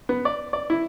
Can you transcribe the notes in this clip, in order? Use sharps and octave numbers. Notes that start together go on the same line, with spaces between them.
B3
D5
D5
E4